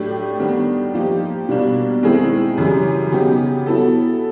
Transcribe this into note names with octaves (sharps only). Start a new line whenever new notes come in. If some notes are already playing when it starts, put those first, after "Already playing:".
Already playing: A2 F#3 A3 D4 G4
D#3 G3 B3 D4
F3 A#3 D#4 G4
B2 G3 A#3 D4
D#3 G#3 C4 E4 G#4
F#2 C#3 E3 G3
C#3 F#3 B3 D#4 G4
F#3 B3 E4 A4